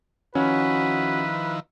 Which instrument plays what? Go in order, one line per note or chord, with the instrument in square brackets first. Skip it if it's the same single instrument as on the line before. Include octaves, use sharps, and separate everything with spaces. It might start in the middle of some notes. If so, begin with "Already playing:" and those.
[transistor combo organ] D#3 F3 E4 [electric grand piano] C#4 [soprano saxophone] F#4 [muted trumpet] B4